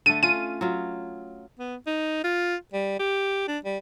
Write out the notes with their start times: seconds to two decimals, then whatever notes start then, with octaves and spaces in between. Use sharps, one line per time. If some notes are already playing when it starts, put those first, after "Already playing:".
0.06 D3 A3 D#7
0.23 C#4 F4 D#7
0.61 F#3 F4
1.59 B3
1.87 D#4
2.24 F4
2.73 G3
2.99 G4
3.48 D4
3.65 G3